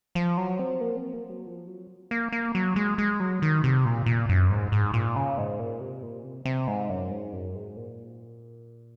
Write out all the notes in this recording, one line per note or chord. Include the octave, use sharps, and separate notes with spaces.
F3
F#3
C4
A#3
C4
A#3
F#3
F3
F#3
A#3
A#3
F#3
G#3
G#3
F#3
D#3
C3
A#2
A#2
F#2
G#2
G#2
A#2
C#3
G#2
A#2
C3
A#2
C3
C3
G#2
F#2
G#2
F#2
G#2
A#2